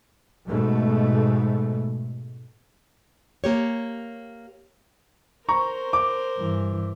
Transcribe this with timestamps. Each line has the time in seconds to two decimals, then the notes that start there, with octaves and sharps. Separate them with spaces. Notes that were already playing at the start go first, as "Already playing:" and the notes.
0.46 G#2 B2 A3
3.44 A#3 G4 C#5
5.49 A#4 C5 A#5 C#6
5.93 D6
6.38 G2 E3